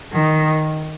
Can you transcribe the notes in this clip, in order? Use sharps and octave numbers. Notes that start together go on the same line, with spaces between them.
D#3